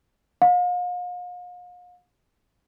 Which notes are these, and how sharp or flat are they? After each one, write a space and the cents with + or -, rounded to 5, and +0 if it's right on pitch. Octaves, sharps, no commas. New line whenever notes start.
F5 +40